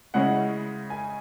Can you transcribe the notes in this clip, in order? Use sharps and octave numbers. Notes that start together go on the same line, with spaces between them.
C#3 G#3 C#4 E4 F#5
G#5